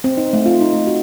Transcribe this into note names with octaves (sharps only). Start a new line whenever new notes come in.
C4
D#4
A3
F4
D#4
A3
F#4